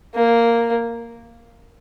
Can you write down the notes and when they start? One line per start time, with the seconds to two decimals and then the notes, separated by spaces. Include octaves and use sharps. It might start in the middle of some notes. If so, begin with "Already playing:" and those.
0.15 A#3